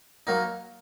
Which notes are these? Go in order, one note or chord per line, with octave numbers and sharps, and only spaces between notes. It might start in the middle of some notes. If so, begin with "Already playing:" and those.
F#3 A#3 D#4